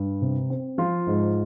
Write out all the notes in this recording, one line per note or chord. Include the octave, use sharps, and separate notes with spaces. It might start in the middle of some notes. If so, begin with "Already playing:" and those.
Already playing: G2
C3
C4
F3 F4
G#2